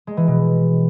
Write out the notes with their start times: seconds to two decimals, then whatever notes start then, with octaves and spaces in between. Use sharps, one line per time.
0.07 G#3
0.17 E3
0.27 B2